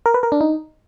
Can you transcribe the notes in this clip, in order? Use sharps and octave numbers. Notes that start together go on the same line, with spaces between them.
A#4
B4
A#4
D4
D#4